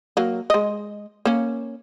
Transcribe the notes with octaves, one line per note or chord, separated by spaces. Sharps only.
F#3 A#3
G#3 D#5
A#3 C#4